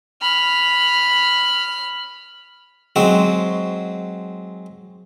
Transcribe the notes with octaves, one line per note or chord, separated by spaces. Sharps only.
B5 F6
F#3 G#3 C4 F#4